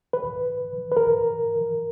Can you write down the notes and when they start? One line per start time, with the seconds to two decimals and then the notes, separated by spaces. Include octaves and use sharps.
0.13 B4
0.92 B4
0.97 A#4